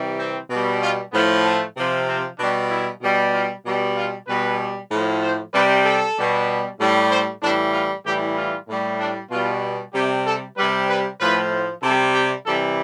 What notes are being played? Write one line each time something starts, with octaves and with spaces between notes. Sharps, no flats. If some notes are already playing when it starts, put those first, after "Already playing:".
Already playing: C3 E3 G3
C4
B2 G3
F4
A2 F3 B3
A3
C3 F3
C4
B2 G3 D4
E4
B2 G3
F4
B2 G3
F4
B2 G3 B4
A2 F3
C5
C3 G3 B4
A4
B2 G3
A2 G3
C5
A2 E3 G3 D4
F4
A2 E3 G3 G4
F4
A2 G3
D4
B2 G3 F4
C3 G3 G4
A4
C3 G3 B4
B4
A2 F3 B4
C3 G3 A4
G4
C3 E3 G3 A4